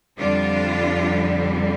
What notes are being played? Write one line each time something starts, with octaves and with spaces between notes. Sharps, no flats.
F2 D3 G3 D4 F4